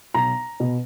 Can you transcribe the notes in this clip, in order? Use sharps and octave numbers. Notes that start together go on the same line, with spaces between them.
B1 A#5
B2